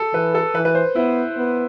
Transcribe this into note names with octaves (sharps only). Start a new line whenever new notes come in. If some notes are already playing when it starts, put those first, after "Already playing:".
Already playing: A4
E3 B4
A4
E3 B4
B4
C5
B3 E4
B3